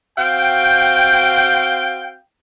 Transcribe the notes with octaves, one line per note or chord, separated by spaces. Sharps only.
C4 F#4 F5 G5